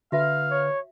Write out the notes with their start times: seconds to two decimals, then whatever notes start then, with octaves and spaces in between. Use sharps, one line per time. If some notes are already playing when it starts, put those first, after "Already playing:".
0.12 D3 F#4 B4 E5 F5
0.51 C#5